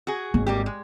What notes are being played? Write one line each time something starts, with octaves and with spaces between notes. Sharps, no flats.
F#4 G#4
G#1
G3 A#3 G4
G#3